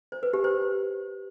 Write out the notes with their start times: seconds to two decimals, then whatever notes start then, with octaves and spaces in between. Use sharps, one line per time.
0.12 C5
0.23 B4
0.33 G4
0.44 C5